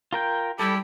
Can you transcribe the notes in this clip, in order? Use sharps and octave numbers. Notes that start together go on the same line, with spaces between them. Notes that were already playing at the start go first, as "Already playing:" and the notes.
F4 A#4 G5
G3 E4 G4 A4